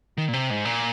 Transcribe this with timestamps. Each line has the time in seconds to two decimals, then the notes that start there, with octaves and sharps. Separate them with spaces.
0.18 D#3
0.29 A#2
0.33 C3
0.50 G#2
0.65 A#2